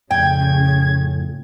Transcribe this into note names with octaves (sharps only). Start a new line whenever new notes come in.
F2 A2 C#3 G5 G#6